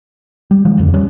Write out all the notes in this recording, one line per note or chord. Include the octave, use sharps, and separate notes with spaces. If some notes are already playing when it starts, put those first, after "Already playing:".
G3
D#3 F3 G#3
D1 F2 D3
G3 C#4